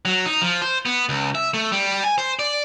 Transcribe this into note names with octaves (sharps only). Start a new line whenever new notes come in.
F#3
D#4
F3
C5
B3
C#2
E5
A3
G3
G#5
C5
D5